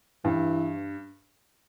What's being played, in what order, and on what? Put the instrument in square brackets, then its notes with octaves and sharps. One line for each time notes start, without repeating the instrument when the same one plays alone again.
[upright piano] G2 [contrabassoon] E3